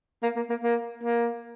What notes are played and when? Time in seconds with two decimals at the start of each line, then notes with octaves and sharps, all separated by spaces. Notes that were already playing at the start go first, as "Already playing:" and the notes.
0.23 A#3
0.36 A#3
0.50 A#3
0.63 A#3
1.03 A#3